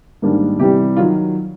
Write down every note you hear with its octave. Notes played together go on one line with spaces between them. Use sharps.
G#2 D#3 G3 A#3 D4
C3 E3 G3 G4
D#3 F#3 F4